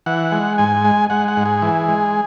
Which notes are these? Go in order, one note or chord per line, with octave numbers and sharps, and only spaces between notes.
E3 F#5
G#3
G#2 G#5
G#3
G#3 F#5
F#5
G#2
G#4
E3
G#3